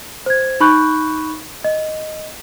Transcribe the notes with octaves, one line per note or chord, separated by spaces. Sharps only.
C5 G#6
D#4 B5 C#6 F#6 G6
D#5